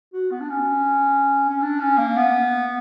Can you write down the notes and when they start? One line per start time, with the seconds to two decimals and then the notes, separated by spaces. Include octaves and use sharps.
0.13 F#4
0.31 B3
0.40 D4
0.50 C#4
1.50 C#4
1.62 D4
1.80 C#4
1.98 A#3
2.17 B3